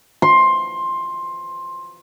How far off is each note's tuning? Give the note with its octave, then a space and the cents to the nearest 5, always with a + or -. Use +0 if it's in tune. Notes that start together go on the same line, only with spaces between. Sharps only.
C6 +15